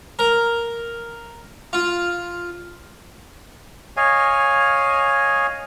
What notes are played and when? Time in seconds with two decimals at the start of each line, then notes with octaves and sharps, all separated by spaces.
0.19 A#4
1.73 F4
3.97 C#5 D#5 F5 G#5